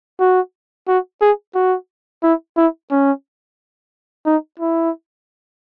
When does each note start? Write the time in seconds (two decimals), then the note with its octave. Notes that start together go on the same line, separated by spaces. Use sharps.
0.20 F#4
0.88 F#4
1.21 G#4
1.55 F#4
2.23 E4
2.57 E4
2.91 C#4
4.26 D#4
4.60 E4